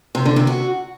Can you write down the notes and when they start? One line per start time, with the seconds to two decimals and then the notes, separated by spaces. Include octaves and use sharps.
0.15 C3
0.26 D3
0.36 C3
0.47 F#4